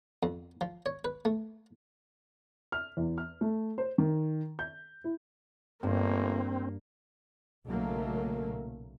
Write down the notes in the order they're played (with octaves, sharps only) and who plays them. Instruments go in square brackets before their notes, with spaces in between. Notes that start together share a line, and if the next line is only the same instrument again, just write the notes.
[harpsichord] F2
F3
C#5
B4
A3
[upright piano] F6
E2
F6
A3
C5
D#3
G6
E4
[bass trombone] G1 [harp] G2 [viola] A#3 [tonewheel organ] C4
[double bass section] B1 A#2 C#3 F#3 A3 A#3